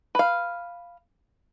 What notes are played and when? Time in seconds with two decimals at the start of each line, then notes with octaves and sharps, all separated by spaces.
0.15 B4 F5